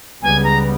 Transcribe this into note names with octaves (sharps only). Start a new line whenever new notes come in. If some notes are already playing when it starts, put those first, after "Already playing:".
C#2 C#3 G3 B3 G#5
A#5